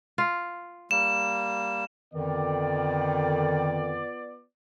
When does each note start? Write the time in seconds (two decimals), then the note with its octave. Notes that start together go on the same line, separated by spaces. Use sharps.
0.18 F4
0.91 G3 A#3 E7
2.14 F2 D3 D#3 B3 F4 D5